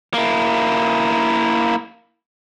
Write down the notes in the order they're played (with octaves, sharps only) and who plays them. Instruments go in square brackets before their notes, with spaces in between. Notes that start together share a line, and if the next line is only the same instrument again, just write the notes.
[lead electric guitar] A#3 E4